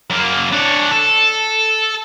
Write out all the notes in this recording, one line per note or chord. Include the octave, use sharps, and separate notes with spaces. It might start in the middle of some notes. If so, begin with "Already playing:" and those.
F#2 A#3
D4 C#5
A4